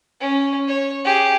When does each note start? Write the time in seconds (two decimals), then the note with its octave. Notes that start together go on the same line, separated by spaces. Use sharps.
0.21 C#4
0.68 C#5
1.04 G4 G#4